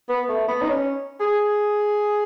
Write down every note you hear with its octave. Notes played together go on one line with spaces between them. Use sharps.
B3
A3
B3
D#4
C#4
G#4